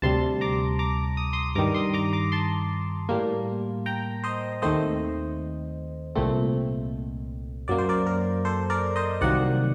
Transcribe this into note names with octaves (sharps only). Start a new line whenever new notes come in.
D2 C3 G3 A5 C6
A#5 D6
A#5 D6
D#6
C6 D#6
G2 D#3 G3 A#5 D6
C6 D#6
A#5 D6
A#5 D6
A5 C6
A2 G3 A#3
G5 A#5
C5 D#5
D#2 D#3 A3 C4 C5 D#5
C2 A#2 A3 C4
F#2 F#3 A#3 D5
C5
A#4 D5
A#4
A4 C5
A#4 D5
C5 D#5
C2 C3 D#3 F#3 A#3 D5 F#5